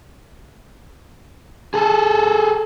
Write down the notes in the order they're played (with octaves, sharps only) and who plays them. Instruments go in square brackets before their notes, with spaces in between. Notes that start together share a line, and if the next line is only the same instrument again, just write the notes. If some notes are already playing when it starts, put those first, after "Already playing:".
[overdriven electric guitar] G#4 A4